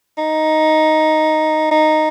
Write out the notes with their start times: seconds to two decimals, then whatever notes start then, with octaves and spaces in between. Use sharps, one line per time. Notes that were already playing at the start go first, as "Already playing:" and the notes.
0.18 D#4
1.71 D#4